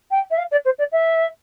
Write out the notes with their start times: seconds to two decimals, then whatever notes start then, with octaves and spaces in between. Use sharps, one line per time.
0.10 G5
0.30 E5
0.37 F5
0.51 D5
0.64 C5
0.78 D5
0.91 E5